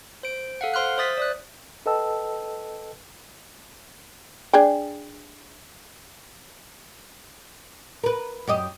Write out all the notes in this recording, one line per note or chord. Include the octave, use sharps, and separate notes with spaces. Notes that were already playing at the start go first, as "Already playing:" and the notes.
C5 D7
A4 F5 F#5
C5 C6 F6 F#6
C5 E5 D#6 A6 B6
D5 D#6 F#6
A4 B4 D#5 G5 A5 E6
D4 G#4 G5
A#4 B4
F#2 G4 D#5